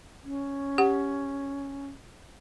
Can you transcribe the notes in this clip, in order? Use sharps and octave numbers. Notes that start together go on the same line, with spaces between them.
C#4
G4 F#5